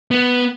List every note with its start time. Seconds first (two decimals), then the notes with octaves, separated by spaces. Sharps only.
0.11 B3